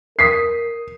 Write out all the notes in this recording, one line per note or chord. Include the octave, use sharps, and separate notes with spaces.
A#4 D#6 B6 C7